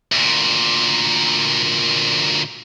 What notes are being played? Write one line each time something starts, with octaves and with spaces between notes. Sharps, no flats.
D2 A#2